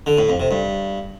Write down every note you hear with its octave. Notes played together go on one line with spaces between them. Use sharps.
D3
A2
F2
C3
G2